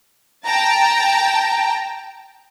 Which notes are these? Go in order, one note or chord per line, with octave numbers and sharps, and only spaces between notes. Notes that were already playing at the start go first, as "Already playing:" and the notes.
G5 A5 A#5